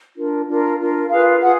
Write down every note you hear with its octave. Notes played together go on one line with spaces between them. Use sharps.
D4 F4 A#4
D4 F4 A#4
D4 F4 A#4
F4 G#4 B4 F5
F4 G#4 F#5